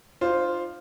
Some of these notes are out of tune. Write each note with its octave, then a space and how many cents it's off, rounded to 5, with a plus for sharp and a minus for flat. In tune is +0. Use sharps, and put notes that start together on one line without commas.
D4 +45 F4 +0 C5 +0